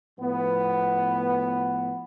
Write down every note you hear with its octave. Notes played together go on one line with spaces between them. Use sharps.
A2 F3 B3